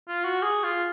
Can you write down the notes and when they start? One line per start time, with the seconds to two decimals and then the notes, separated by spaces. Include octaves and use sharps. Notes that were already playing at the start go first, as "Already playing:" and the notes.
0.08 F4
0.25 F#4
0.42 G#4
0.64 F4